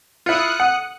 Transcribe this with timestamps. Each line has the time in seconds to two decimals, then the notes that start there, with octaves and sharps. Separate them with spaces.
0.26 E4 F4 D#6 F#6 C#7
0.60 F#5